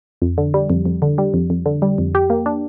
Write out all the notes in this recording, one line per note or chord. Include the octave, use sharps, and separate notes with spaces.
F2
D3
G3
F2
F2
D3
G3
F2
F2
D3
G3
F2
G4
A#3
D4